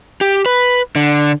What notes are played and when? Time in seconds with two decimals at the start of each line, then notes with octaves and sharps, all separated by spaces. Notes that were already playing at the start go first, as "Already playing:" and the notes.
0.21 G4
0.46 B4
0.96 D3